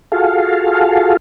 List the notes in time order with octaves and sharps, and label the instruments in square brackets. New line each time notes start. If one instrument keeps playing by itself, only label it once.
[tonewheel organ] F4 F#4 G#4 A4 F5